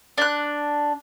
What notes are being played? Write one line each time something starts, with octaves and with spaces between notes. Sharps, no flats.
D4 F#6